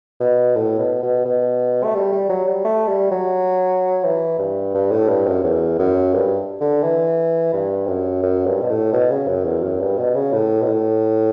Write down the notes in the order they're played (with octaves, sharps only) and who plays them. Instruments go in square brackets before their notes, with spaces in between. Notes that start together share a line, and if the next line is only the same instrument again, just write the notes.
[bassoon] B2
A2
B2
B2
B2
A3
G3
G3
F#3
G3
A3
G3
F#3
E3
G2
G2
A2
G2
F#2
E2
F#2
G2
D3
E3
G2
F#2
F#2
G2
B2
A2
B2
C#3
F#2
E2
F#2
G2
B2
C#3
A2
B2
A2